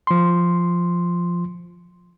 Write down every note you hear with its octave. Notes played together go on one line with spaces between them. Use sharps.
F3 C6